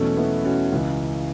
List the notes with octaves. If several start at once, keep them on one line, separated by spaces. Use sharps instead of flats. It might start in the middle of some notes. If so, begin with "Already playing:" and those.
Already playing: E2 B2 F#3 A3 C#4
B3 E4
C#4 F#4
C#2 C#3 E3